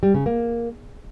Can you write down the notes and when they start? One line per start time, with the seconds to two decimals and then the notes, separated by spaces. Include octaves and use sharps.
0.03 G3
0.14 C#3
0.26 A#3